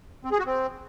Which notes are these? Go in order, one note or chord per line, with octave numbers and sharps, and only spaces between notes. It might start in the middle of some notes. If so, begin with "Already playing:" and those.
C4
G#4
F#4
C4